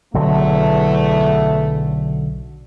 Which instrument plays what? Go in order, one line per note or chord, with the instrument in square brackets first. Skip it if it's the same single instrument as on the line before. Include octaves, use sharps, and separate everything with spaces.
[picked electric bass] B1 D3 F#3 [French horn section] E2 A3